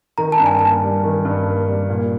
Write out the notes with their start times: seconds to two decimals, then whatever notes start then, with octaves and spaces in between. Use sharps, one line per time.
0.18 D#3 A#5
0.32 A5
0.39 G2
0.46 G#5
0.59 A#3 A5
0.82 G3
1.04 D#3
1.25 G2
1.47 A#3
1.67 G3
1.89 A#2